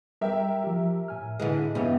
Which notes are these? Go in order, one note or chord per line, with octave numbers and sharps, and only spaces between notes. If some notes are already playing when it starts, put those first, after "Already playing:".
G3 A#4 E5 G5
F3 G4
A2 G#5 F6
D3 E3 G#3
G2 C#3 E3 B3 D#5 E5